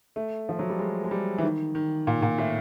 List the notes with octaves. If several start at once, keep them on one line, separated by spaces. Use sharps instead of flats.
A3
F3
F#3
G3
G#3
G#3
G3
E3
D#3
D#3
A#2
A#2
A2